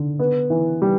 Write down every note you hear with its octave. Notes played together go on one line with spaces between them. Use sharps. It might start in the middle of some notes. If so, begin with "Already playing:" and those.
Already playing: D3
B3
E3
G3